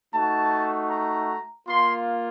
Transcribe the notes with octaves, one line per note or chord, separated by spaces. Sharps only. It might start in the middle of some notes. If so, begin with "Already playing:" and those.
A3 D#4 F#4 A5
A#5
A#3 F4 C6